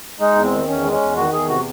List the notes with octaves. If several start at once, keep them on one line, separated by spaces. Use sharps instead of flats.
G#3 D#4
E2
C4
D#3
E2 C#4
G#3
C#4
E2
D#3 F#4
E2 G#4
C3 F#4